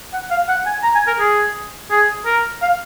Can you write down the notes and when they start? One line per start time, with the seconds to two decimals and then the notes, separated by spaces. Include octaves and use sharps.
0.13 F#5
0.31 F5
0.48 F#5
0.66 G#5
0.83 A#5
0.95 G#5
1.07 A#4
1.19 G#4
1.91 G#4
2.25 A#4
2.62 F5